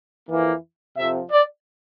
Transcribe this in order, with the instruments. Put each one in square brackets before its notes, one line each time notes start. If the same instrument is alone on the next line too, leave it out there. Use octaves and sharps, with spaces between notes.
[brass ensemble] F2 E3 A#3
F2 C3 F3 E5
D5